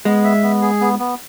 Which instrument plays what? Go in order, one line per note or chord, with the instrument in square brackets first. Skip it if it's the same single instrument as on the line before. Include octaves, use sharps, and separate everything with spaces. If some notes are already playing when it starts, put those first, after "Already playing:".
[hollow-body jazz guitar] G#3 [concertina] B3
[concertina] E5
B3
G#4
B3
B3